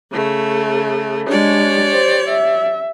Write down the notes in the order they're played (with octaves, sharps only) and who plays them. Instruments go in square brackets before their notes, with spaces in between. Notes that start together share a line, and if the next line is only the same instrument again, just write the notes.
[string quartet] C#3 A3
[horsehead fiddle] G#3 D4 [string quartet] G4 C#5 D5
[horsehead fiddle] C5
E5